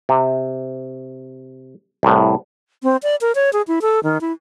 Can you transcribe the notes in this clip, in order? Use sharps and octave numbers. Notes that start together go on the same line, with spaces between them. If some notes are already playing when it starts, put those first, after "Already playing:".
C3
C2 A2
C4
D5
A#4
C#5
G#4
E4
A4
D#3
E4